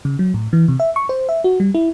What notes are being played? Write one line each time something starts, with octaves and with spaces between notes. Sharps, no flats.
C#3
F#3
A2
E3
C3
E5
C#6
C5
E5
F#4
G3
E4